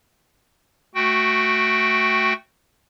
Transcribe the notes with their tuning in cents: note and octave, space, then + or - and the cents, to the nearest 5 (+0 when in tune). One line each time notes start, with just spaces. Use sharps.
A3 +0 F#4 +0 G5 +0